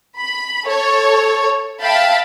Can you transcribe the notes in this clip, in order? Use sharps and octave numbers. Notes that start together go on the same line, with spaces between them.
B5
A4 C#5
E5 F5 G5 A5 B5